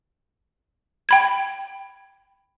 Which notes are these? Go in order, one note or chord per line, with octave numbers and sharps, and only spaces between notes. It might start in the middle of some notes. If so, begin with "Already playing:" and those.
G5 B5 G#6